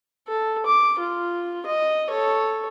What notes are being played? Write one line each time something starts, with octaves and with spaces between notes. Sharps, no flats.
A4
D6
F4
D#5
A4 C#5